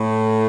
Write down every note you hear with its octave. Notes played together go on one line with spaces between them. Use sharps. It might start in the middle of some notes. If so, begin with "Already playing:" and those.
Already playing: A2